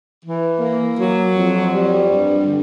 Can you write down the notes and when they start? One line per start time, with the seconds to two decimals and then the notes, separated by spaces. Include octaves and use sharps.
0.23 E3
0.60 A#3
0.97 F#3
1.34 F2
1.70 G3
2.07 G2
2.45 D3